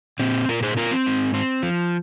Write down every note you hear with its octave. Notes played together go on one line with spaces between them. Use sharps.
A#2 C4
A#2 F4 A#4
G#4 C5
C4 F4 A#4
C4
G#2
C4
F3